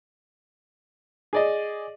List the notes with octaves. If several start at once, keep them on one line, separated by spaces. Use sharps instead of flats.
G#4 D5 D#5